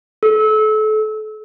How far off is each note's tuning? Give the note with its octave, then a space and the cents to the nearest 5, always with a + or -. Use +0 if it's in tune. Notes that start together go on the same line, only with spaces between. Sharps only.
A4 -30